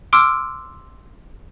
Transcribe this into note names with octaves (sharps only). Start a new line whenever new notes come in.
C6 D6 E6 F6 D7